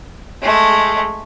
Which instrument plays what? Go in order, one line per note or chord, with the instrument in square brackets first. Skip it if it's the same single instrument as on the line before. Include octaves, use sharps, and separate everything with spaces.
[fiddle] G#3 A3